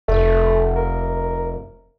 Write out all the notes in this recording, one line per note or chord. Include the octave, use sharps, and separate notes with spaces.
F1 A3
A#4